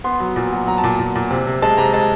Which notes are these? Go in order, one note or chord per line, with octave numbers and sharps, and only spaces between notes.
B3 C6
F#3
A#2
F#3
F#3 A#5
A5
A#2
A#2
A#2
C3
C3
G#3 A5
C3 A#5
G#3 A5